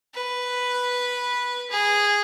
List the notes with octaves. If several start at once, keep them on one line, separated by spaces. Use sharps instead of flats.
B4
G#4